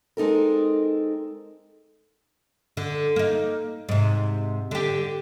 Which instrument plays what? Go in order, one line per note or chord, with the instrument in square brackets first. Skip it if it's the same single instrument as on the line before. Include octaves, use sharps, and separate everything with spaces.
[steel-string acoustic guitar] G#3 C4 D#4 A4 A#4
[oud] D3
A#3 D#4
G#2 C3
D3 G4